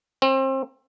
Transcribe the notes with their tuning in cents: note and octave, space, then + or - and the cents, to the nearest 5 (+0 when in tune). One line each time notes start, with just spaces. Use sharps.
C4 +30